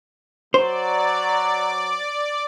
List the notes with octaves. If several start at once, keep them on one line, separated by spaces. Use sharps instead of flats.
F#3 C5 D5